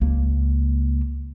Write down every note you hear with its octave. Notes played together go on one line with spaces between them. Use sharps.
C#2 A#3